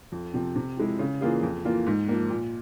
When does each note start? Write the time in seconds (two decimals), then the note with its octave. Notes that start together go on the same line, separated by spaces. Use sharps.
0.12 F2
0.34 C3 F3 C4
0.56 C3
0.77 F3 G#3 E4
0.99 C#3
1.21 E3 A#3 F4 G#4
1.43 F2
1.65 E3 A#3 F4
1.87 G#2
2.08 F3 A#3
2.30 A#2